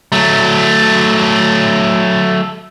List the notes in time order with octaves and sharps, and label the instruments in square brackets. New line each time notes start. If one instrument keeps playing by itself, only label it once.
[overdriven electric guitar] F#3 A3